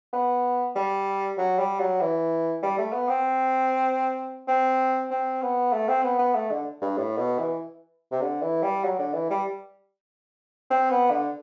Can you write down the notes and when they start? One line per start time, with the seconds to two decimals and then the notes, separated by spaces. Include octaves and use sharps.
0.13 B3
0.75 G3
1.38 F#3
1.59 G3
1.80 F#3
2.01 E3
2.63 G3
2.78 A3
2.93 B3
3.09 C4
4.48 C4
5.11 C4
5.42 B3
5.73 A3
5.89 C4
6.03 B3
6.19 B3
6.35 A3
6.51 D3
6.82 G2
6.97 A2
7.18 B2
7.39 E3
8.12 C3
8.21 D3
8.42 E3
8.62 G3
8.84 F#3
8.99 D3
9.14 E3
9.30 G3
10.70 C4
10.90 B3
11.11 D3